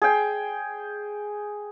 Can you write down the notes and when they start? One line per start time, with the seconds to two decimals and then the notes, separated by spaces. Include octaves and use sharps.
0.02 G#4 G5